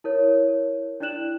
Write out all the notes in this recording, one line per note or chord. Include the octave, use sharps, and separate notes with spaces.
E4 A#4 C#5
D4 E4 D5 F#6 E7 F#7